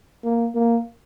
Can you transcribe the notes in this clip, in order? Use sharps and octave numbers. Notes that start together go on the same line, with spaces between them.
A#3
A#3